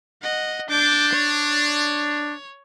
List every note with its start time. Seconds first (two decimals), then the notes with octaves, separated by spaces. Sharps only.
0.22 D#5 F#5
0.70 D4 D6 G6
1.13 C#5